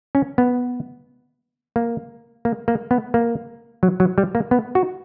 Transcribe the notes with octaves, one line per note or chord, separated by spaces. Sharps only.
C#4
B3
A#3
A#3
A#3
B3
A#3
F#3
F#3
G3
A#3
B3
F#4